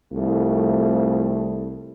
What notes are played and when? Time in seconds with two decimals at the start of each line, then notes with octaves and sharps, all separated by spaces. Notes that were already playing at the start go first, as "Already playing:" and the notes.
0.13 C2 F2 A3